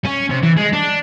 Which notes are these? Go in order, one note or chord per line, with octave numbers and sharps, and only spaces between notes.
C#4
C3
E3
G#3
D4